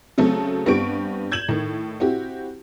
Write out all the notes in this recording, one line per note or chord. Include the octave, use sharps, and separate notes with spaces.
C#3 F#3 A3 C4 A4
G2 B3 C4 G4 C#6 D7
G6 G#6 E7 F#7
A2 D#3
C4 E4 F#4 G4